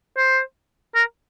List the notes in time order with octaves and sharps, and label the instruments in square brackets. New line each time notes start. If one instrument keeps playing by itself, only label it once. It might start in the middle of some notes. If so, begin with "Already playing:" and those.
[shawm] C5
A#4